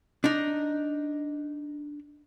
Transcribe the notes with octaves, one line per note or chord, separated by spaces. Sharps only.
D4 D#4